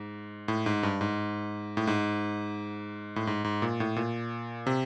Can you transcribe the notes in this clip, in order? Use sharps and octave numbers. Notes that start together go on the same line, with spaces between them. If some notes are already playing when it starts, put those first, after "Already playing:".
Already playing: G#2
A2
G#2
G2
G#2
A2
G#2
A2
G#2
G#2
A#2
A2
A#2
C3